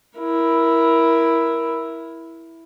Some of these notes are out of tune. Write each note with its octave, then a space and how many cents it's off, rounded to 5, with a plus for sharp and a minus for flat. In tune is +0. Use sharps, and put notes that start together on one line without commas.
E4 +0 A#4 +15